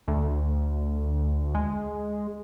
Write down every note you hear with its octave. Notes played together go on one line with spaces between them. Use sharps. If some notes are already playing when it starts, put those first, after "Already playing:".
D2
G#3